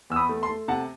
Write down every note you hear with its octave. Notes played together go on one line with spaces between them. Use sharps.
E2 E6
B5 D#6
A3
A5 C6
A3
C3 F#5 A5